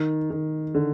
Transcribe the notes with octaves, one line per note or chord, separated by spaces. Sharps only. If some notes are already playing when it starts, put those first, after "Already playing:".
Already playing: D#3
D#3
D3